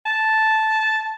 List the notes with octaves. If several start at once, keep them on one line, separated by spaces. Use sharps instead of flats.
A5